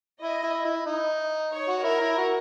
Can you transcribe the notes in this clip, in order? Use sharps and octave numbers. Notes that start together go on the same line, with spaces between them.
E4 D#5
E4
E4
D#4
C#5
F#4
E4 A#4
E4
F#4